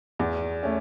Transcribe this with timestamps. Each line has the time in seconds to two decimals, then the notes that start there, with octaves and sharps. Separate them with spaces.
0.19 E2
0.63 A3 C#4